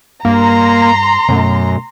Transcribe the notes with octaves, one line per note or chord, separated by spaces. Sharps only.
G2 A#3 A#5 C6
F#2 B2 A3